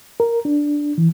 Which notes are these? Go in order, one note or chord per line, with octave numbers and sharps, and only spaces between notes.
A#4
D4
E3